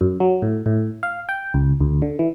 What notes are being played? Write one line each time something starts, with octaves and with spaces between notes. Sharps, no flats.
F#2
F#3
A2
A2
F5
G5
C#2
D2
D3
E3